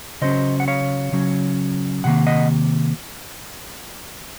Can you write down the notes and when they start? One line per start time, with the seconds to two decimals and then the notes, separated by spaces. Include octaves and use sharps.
0.22 C#3 F#3 C#4 C5 D#5
0.60 F#5
0.68 C#5 F5
1.12 C#3 F#3 C#4
2.04 C3 D#3 A#3 F#5
2.27 D#5 F#5